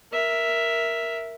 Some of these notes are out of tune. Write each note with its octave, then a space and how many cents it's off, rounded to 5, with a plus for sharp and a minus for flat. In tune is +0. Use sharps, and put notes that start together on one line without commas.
A#4 +0 E5 +0